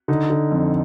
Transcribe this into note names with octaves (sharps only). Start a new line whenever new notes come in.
D3 D#4
D3
F2